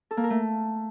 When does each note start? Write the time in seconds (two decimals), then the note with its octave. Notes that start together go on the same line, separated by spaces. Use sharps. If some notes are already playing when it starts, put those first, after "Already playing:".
0.11 A4
0.17 A#3
0.24 A#4
0.30 A3